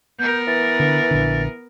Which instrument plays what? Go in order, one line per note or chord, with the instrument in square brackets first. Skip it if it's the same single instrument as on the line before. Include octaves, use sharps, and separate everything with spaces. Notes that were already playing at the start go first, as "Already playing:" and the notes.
[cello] B3 A#4 [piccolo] G6
[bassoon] E3 [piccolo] A6
[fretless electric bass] D3
A#1 D3